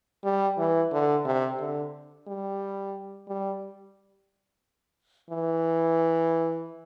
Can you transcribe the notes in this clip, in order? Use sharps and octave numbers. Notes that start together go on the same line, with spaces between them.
G3
E3
D3
C3
D3
G3
G3
E3